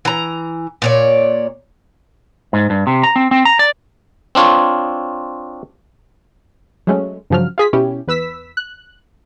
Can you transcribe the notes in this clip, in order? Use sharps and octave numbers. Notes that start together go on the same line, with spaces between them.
E3 A#5
A#2 C#5 D5
G#2
G2
C3
A#5
C4
C4
A#5
D5
C4 D4 F4 C#5
F#3 G#3 A3 C#4
G2 C#3 F3 F#3 F6
F4 G#4 B6
B2 C#4 E4 G4
E2 B4 E6 B6
F#6